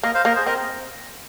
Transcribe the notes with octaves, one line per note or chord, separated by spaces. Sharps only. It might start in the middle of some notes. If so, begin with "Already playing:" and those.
A#3 A#4 D#5
C5 F5
A#3 A#4 D#5
G#4 C5
C4 A#4 D#5